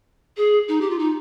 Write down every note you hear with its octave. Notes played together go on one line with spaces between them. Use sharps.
G#4
D#4
G4
F4
D#4